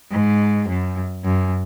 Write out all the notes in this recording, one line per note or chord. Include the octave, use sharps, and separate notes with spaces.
G#2
F#2
F#2